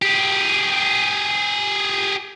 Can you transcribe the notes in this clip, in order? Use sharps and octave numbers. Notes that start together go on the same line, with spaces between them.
G4 G#4